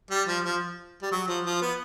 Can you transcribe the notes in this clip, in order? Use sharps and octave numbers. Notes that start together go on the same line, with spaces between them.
G3
F3
F3
G3
F#3
F3
F3
B3